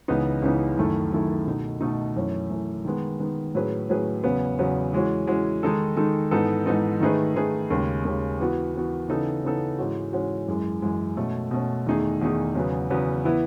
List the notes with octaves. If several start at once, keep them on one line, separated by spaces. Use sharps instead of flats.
C#2 C#3 E3 B3 D#4
C#2 C#3 E3 B3 D#4
F#2 D#3 A3 E4 A4
F#2 D#3 A3 E4 A4
B2 A3 D#4
B2 A3 D#4
F#2 E3 A3 C#4
F#2 E3 A3 C#4
D#3 G#3 B3
D#3 G#3 B3
A2 F#3 C#4 G#4 B4
A2 F#3 C#4 G#4 B4
E2 C#3 F#3 B3
E2 C#3 F#3 B3
E3 G#3 C#4 F#4
E3 G#3 C#4 F#4
D#3 G#3 D#4 A4
D#3 G#3 D#4 A4
G#2 E3 B3 D#4 A4
G#2 E3 B3 D#4 A4
D#3 A3 D#4 G#4 B4
D#3 A3 D#4 G#4 B4
D#2 C#3 G#3
D#2 C#3 G#3
E3 B3 F#4
E3 B3 F#4
C#3 E3 B3 D#4 A4
C#3 E3 B3 D#4 A4
G#2 E3 G#3 C#4 F#4
G#2 E3 G#3 C#4 F#4
F#2 E3 G#3
F#2 E3 G#3
B2 A3 C#4
B2 A3 C#4
E2 D#3 A3 D#4 G#4
E2 D#3 A3 D#4 G#4
E2 C#3 F#3 B3
E2 C#3 F#3 B3
E3 B3 E4